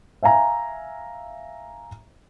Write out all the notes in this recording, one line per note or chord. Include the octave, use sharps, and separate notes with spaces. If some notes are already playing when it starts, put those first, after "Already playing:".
E5 F5 G#5 A#5